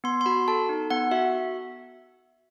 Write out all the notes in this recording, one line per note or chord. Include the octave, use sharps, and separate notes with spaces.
B3 C6
C6
F#4 B5
A4 A5
D#4
B3 F#5
F#4 E5